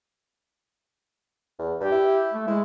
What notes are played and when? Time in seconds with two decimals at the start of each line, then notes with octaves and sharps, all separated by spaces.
1.59 E2
1.80 G2 G4
1.92 E4
2.34 A3
2.47 G#3 E4